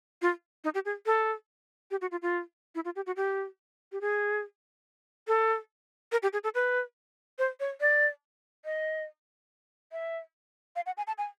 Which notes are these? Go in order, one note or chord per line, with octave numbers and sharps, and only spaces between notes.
F4
D#4
G4
G#4
A4
G4
F#4
F4
F4
E4
F4
G4
F#4
G4
G4
G#4
A4
A#4
G4
G#4
A4
B4
C5
C#5
D5
D#5
E5
F5
F#5
G#5
A5
G#5